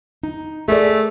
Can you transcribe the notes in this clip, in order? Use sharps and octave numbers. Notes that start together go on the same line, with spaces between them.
D#4
A3 G#4 A#4 D5